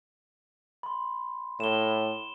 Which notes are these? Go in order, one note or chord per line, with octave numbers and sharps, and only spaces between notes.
B5 C6
A2 E7 G7